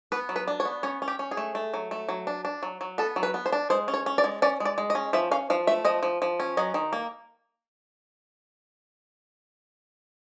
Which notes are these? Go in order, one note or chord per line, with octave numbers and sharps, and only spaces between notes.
B3 B4
F#3
B4
D4
C#5
B3
C#4 C#5
C#4
G4
C#4
G#4
A3
A3
F#3
A3
F#3
D4
D4
F#3
F#3
B3 A4
F#3
B4
B3
C5
D4
G#3 C5
C#4
C#5
C#4
D5
G#3
C#4 D5
G#3
D5
G#3
D#5
C#4
F3 E5
C#4 F5
F3 F5
A3 E5
F3 D#5
F3
F3
C#4
F#3 D#5
D#3
A#3